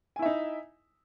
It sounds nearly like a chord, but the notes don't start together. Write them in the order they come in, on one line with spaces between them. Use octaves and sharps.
G#5 E4 E5 D#4